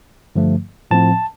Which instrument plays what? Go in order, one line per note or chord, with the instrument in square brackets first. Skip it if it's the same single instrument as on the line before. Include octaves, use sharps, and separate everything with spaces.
[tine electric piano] G2 D3 F3 A3
A2 F3 C4 A5